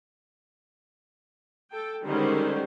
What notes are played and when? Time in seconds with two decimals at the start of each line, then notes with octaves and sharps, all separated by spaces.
1.72 A4 G5
2.03 D3 D#3 G3 G#3 C#4 C5